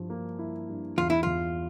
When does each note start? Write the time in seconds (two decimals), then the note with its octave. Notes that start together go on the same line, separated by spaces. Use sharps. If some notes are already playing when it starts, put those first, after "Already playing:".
Already playing: G2 F3 E4
0.10 A#3
0.39 E4
0.69 G2
0.97 E2 F4
1.10 E4
1.23 E2 F4